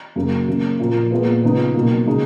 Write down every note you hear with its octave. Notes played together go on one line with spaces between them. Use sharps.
F#2 C#3 F#3 A#3
C#3 F#3 A#3 C#4
A#2 F3 A#3
A#2 G#3 B3 F4
C#3 F3 B3 D#4
B2 F#3 A#3
C#3 G#3 D#4